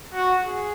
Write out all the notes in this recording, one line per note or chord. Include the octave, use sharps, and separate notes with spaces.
F#4
G#4